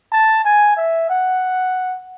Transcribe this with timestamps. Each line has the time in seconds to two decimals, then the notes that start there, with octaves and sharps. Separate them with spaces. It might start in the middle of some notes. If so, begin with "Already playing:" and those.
0.12 A5
0.45 G#5
0.77 E5
1.10 F#5